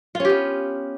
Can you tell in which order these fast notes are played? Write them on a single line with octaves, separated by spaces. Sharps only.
F4 C#4 G4 B3